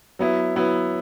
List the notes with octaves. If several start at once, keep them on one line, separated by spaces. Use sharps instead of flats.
F#3 B3 E4
F#3 B3 E4